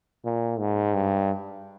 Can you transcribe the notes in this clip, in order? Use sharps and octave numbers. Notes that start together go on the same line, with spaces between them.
A#2
G#2
G2